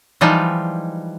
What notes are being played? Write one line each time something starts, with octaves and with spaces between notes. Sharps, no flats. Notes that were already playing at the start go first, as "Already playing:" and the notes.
E3 F3 G3 G#3 D#4 F4